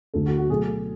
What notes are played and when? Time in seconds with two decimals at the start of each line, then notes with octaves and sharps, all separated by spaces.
0.14 D2 D3 A3 A4
0.26 F#4
0.37 F#4
0.49 B2 F#3 A3 G#4